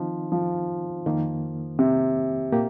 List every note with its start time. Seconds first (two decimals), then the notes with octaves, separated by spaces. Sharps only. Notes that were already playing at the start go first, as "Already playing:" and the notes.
Already playing: D#3 F3 C4 D#4
0.32 F3
1.06 F2 D#3 A#3
1.79 C3
2.52 A#2 A#3 G4